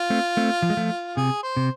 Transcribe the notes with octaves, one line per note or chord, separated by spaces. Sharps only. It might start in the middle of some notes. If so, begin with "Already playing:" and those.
Already playing: F4
A3 C4
A3 C4
F3
G#3
F3 A3
C3 G#4
C5
C3